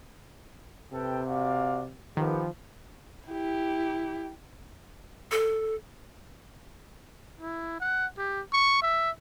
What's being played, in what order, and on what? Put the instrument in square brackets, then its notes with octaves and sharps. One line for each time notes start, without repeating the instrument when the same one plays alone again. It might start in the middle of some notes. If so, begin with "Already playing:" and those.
[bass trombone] C3 [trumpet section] A4 B4 G5
[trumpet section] F#4 D5 F5
[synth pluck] D#3 [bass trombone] F3 [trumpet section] B3 G4
[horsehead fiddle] E4 G4
[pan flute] A4
[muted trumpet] E4
F#5
G4
C#6
E5